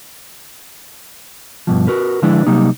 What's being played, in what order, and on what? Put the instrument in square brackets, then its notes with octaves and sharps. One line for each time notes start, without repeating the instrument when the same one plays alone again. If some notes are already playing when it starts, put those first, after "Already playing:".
[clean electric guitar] G2 B2 F3
F#4 A#4 B4
D3 F3 G#3 D4 E4 B4
C3 F#3 G3 A#3 D#4